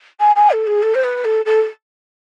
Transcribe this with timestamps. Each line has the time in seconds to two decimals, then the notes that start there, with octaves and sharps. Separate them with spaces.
0.20 G#5
0.35 G#5
0.51 A4
0.67 G#4
0.82 A4
0.94 C5
1.03 B4
1.24 A4
1.45 A4